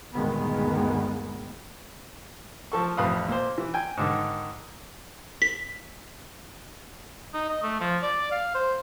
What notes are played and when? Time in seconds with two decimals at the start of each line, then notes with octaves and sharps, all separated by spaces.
0.15 D2 G2 A#2 D#3 G#3 B3
2.72 F3 A4 C#6
2.97 A1 F2 B4 F5 D#6
3.28 A#2 C5
3.58 E3
3.74 G5 G#5
3.97 G#2 D3 D#3
5.42 B6
7.34 D#4
7.49 D#5
7.63 A3
7.81 F3
8.02 D5
8.31 F5
8.55 C5